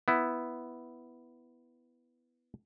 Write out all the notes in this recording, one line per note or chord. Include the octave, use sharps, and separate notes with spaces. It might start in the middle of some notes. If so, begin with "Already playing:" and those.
B3 E4